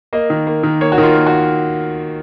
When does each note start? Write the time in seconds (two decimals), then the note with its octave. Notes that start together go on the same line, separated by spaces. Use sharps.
0.13 A#3 D#5
0.30 D#3
0.47 A#3
0.63 D#3
0.81 A#3 C#5
0.92 F#4
0.98 D#3
1.03 F4
1.15 A#3
1.26 F#4